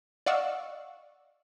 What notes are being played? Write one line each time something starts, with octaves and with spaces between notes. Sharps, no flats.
D5 D#5 F5 F#5 C#6 E6